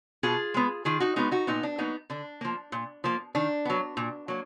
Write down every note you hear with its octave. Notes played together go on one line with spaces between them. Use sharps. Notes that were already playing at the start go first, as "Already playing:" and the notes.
B2 F4 G#4
G#3 B3
D#3 F4 G#4
D#4 F#4
G#3 B3 D#4 F#4
D#4 F#4
A#2 B3 D#4
D4
F#3 A#3 B3 D#4
D3 D4
F3 A#3
A#2
F3 A#3
D#3 D4
F#3 B3
A#2
F#3 A#3